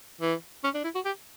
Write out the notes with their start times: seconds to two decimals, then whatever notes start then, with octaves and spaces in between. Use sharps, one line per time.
0.21 E3
0.64 C#4
0.75 D4
0.84 E4
0.95 F#4
1.05 G4